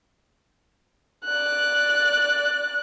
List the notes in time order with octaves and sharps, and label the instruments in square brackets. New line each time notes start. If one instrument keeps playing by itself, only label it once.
[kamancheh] D5 F#6